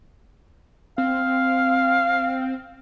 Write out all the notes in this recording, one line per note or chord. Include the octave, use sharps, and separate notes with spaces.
C4 F5